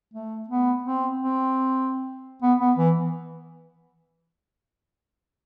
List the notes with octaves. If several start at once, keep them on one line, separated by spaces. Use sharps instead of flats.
A3
B3
C4
C4
B3
B3
E3